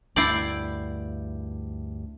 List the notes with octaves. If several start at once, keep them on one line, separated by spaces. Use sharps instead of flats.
D2 G2 E4 D5 G6 C7 D7